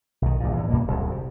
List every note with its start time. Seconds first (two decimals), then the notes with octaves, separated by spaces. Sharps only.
0.22 B1 D#3
0.40 A#1 G2 A#2
0.53 E2 A2
0.70 F#2 B2 A#3
0.87 D1 C2 F#2 C#3
1.12 C3